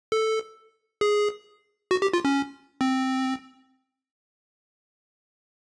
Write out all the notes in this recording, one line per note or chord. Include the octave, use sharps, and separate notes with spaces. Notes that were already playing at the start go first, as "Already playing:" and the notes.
A4
G#4
F#4
G4
F4
C#4
C4